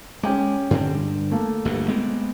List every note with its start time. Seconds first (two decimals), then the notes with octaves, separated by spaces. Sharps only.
0.23 G#3 C#4 G5 D6
0.71 G2 D3 C4
1.31 A3 A#3
1.65 G1 D2 B2
1.88 G#3 B3 C4